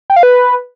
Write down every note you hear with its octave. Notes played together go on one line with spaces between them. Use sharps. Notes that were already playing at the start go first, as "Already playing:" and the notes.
G5
F5
B4